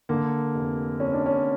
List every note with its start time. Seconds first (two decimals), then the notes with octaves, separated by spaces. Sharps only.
0.09 D3 A#3
0.54 F1
1.00 F2 C#4
1.14 D4
1.26 C#4